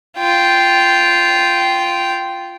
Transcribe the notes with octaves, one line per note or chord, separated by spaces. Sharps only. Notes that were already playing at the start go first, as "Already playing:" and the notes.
F4 G5